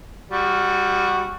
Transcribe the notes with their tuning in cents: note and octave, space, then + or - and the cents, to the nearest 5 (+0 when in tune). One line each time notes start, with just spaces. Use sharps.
G3 +20 F#4 -5